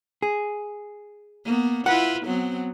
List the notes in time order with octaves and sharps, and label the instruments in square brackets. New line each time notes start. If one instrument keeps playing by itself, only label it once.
[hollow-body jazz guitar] G#4
[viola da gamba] A#3 B3
[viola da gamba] E4 F4 B4 [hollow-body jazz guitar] F#5
[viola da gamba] F#3 B3 C4